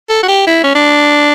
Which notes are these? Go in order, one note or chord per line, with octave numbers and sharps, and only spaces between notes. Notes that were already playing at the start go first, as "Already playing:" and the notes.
A4
F#4
G4
E4
C#4
D4